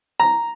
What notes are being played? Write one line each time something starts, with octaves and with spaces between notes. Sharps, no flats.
A#5